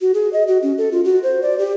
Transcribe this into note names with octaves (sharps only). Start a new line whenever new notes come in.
F#4
G#4
D#5
F#4
C#4
A4
F4
F#4
C5
D5
G4